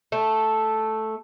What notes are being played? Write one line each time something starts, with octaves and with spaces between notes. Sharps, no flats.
A3